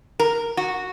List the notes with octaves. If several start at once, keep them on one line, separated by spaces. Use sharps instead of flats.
A#4
F#4